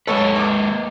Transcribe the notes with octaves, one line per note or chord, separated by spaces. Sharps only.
G#3 A#3 A4 B4 C#5
G#1 D6